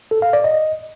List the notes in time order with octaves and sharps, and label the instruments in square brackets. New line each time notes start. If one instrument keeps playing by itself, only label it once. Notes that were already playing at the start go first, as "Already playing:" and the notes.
[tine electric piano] A4
F5
D5
D#5